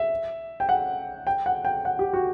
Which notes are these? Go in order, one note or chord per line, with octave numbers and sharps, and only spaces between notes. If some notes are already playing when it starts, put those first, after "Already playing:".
Already playing: E5
G5
F#5
G5
F#5
G5
F#5
G4
F#4